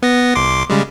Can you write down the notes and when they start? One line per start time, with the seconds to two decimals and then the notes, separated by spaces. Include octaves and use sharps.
0.02 B3 A#6
0.35 C2 C6 D6
0.69 C#3 G3 G#3